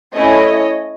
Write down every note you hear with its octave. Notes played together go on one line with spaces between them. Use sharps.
A3 C#4 E4 C#5 D#5